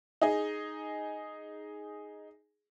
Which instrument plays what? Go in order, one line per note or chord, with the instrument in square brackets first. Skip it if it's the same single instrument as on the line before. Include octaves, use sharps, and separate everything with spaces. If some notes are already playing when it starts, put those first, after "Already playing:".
[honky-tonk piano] D#4 G#4